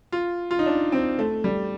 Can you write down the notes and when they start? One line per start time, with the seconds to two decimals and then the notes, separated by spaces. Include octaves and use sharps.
0.12 F4
0.51 F4
0.59 D#4
0.66 D4
0.92 C4
1.19 A3
1.44 G3